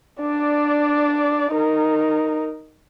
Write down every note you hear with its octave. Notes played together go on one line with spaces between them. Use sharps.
D4 D5
D#4 A#4